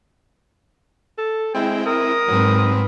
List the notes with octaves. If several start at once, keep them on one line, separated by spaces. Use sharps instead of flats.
A4
G#3 C4 E4 G5
A#4 D#6
G#2 F#3 C4 B4